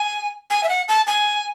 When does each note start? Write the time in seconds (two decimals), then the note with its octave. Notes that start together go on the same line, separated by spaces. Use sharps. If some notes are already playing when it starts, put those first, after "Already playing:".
Already playing: G#5
0.50 G#5
0.64 E5
0.69 F#5
0.88 A5
1.07 G#5